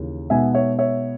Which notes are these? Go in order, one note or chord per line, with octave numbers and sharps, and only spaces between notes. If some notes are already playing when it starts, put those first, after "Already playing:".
Already playing: D#2 C#3 E3
B2 G#3 B3 D#4 E5 G#5
C#5 E5
C#5 E5